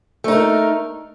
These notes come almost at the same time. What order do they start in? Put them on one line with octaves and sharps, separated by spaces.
A3 D#4 A#4